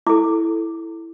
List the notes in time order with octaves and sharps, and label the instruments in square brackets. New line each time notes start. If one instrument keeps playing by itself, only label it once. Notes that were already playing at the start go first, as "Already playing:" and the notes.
[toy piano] E4 A4 D6